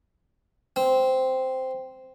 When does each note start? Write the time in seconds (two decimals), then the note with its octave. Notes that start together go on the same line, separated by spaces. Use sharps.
0.76 C4